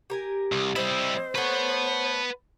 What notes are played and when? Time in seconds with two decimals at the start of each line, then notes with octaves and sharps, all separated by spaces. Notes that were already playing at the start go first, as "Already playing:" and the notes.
0.10 G4 A#4 G#5
0.52 C2
0.76 G3 C4 E4 C5 D#5
1.35 A3 B3 B4 C#5 F#5